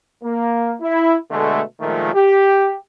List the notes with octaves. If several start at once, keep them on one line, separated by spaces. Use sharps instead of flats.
A#3
E4
B2 D3 G#3 A3
A#2 D#3 F3 G#3 A3
G4